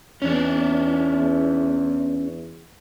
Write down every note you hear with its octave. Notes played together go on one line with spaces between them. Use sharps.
E2 C#4 D4